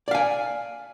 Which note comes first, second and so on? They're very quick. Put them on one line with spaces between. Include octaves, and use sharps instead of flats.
D5 F5 G#5